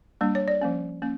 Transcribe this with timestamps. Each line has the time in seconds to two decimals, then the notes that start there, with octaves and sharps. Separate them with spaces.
0.21 G3 A#3 D4
0.35 C#5
0.48 D5
0.61 F3 A#3 C#4
1.02 A#3 C#4